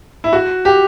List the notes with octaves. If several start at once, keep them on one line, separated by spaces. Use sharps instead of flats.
E4
F#4
G4